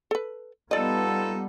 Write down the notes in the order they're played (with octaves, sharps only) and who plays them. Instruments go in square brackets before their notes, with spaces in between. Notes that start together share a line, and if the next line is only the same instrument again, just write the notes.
[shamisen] A4 B4
[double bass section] G3 B3 [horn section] D#4 F4 A4 [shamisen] D5 D#5